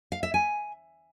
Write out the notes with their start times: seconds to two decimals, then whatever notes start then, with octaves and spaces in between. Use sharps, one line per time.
0.12 F5
0.23 E5
0.34 G#5